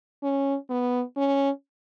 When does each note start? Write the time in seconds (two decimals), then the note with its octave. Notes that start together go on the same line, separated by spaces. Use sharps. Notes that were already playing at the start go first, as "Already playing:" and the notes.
0.23 C#4
0.70 B3
1.17 C#4